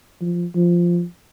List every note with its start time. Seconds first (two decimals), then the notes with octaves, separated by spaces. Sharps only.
0.22 F3
0.55 F3